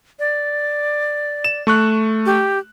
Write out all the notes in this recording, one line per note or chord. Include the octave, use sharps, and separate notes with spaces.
D5
E7
A3 C#6 F#6
G4